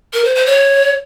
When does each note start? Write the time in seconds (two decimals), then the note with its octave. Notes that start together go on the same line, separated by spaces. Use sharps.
0.14 A#4
0.24 C5
0.35 C5
0.46 C#5